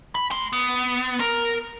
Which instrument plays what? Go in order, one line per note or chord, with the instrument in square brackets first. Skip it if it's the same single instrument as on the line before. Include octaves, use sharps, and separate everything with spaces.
[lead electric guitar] B5
A3 C6
B3
A#4